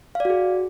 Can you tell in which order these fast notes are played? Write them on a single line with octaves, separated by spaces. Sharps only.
F5 D5 F#4 G#4